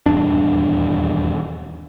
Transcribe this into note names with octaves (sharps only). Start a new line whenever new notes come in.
D#1 E2 G2 D4